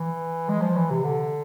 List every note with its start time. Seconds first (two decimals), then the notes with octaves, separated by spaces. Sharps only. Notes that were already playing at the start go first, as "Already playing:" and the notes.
Already playing: E3
0.49 G#3
0.62 F3
0.76 E3
0.90 C3
1.04 D3